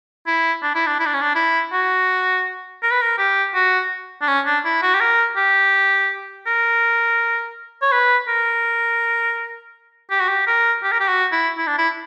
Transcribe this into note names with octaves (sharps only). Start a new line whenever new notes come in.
E4
D4
E4
D4
E4
D4
C#4
D4
E4
F#4
A#4
B4
A#4
G4
F#4
D4
C#4
D4
E4
F#4
G4
A#4
G4
A#4
C#5
B4
A#4
G4
F#4
G4
A#4
G4
A#4
G4
F#4
E4
E4
D4
E4